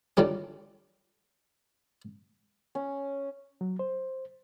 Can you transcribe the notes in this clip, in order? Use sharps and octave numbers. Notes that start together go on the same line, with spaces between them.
A#2 D3 D#3 G3 C#4
C#4
F#3
C5